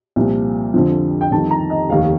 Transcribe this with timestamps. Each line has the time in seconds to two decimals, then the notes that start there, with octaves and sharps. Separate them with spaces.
0.16 C2 A#2 F3
0.74 F2 D3 F3
1.21 G5
1.31 F2 D#3 G3 A5
1.51 A#5
1.70 D#5
1.89 F1 D#2 D#3 F5